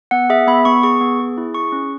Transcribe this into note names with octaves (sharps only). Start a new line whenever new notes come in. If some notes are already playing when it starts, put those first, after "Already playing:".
B3 F#5
G#4 E5
B3 B5
B3 C#6
G#4 C#6
B3
G#4
E4
G#4 C#6
C#4